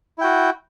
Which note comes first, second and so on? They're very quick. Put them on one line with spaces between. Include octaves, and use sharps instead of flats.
E4 G5 F#4